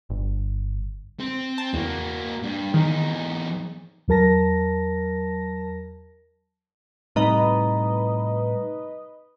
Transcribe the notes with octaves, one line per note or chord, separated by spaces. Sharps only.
G1
C4
A5
E2 A#3 F#4
G2
E2 D#3 D#4
E2 F#3 A#4 A5 A#6
A2 C3 G3 D#4 B4 D#5 A#5